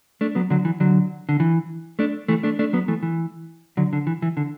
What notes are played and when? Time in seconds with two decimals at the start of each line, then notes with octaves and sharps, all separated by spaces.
0.21 A3 D4
0.35 F#3 B3
0.50 D3 F#3
0.65 E3
0.80 D3 F#3
1.29 D3
1.40 E3
1.99 A3 D4
2.28 E3 A3
2.43 A3 D4
2.59 A3 D4
2.73 F#3 B3
2.88 E3 A3
3.03 E3
3.77 D3 F#3
3.93 D3
4.07 E3
4.22 E3
4.37 D3